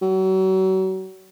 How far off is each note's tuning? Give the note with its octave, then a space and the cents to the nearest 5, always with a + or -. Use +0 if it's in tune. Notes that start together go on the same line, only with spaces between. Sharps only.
F#3 +35